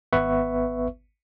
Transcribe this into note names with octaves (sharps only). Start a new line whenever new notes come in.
G#1 B3 B4 E5 C#6